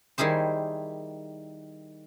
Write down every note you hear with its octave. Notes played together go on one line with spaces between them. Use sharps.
D#3 G3 E4 G#4 C5